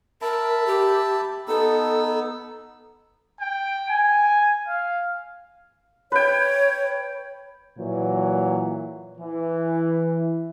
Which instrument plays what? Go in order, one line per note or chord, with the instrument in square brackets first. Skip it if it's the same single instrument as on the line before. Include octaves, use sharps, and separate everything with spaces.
[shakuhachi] A#4 [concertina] E5 A5 B5
[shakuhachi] G4
[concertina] B3 D#4 E6 [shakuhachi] A4
[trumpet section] G5
G#5
F5
[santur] B4 G5 [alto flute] C#5
[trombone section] A#2 E3 F#3
E3